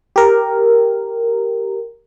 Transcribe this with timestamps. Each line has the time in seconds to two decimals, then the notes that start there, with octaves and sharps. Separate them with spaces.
0.16 G4 A#4